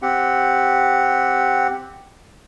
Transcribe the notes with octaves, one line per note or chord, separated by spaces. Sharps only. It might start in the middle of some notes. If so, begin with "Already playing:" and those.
C4 G4 F#5